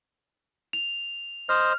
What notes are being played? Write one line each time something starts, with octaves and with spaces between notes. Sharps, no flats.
F7
C5 D#5 F6